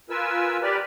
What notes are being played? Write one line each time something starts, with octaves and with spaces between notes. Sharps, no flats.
F4 A#4 B4 G#5 E6
G4 A#4 B4 D5